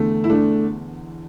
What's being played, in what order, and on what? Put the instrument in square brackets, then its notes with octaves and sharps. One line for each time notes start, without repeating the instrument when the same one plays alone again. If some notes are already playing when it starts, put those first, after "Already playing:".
Already playing: [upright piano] E2 D3 A3
E4
A3 D4